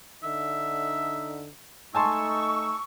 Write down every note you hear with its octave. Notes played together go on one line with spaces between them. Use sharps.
D3 D#4 E5
A3 D#4 G#5 A5 C6 C#6 E6